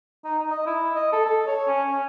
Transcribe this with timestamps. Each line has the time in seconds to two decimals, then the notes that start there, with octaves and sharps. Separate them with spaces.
0.24 D#4
0.38 D#4
0.51 D#5
0.66 E4
0.95 D#5
1.13 A4
1.26 A4
1.47 C#5
1.68 C#4
1.92 C#4